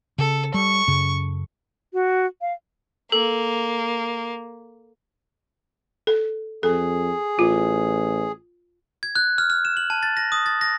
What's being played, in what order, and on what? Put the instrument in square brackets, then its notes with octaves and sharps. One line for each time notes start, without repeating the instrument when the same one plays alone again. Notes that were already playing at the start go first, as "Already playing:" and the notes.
[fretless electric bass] C#3 [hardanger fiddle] A4
[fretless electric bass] G3 [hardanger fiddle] C#6
[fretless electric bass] F#2 C#3
[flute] F#4
F5
[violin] A#3 [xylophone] A4
[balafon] A4
[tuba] F2 [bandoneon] G#4 [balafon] A4
[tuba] A1 [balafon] F4
[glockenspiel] G#6
F#6
F6
F6
E7
F#7
A5
A6
A#6
D#6
A6
A#6